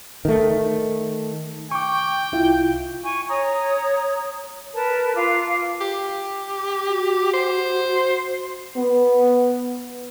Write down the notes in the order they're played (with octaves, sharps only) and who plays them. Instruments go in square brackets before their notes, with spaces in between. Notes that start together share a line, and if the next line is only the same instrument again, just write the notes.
[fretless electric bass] D#3 A3
[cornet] G5 [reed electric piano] C#6 D6
[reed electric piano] C2 E4 F4
[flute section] G#5 C#6
C#5 A#5 D#6
A#4 B4 A5
F4 F5 D6
[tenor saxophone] G4
[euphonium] F#4
[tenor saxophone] C5
[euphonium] B3